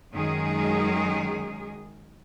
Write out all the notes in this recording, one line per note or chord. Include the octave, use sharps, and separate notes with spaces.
F#2 D#3 G#3 G#4